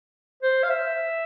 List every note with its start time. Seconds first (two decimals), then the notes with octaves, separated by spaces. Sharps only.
0.43 C5
0.64 F5
0.69 E5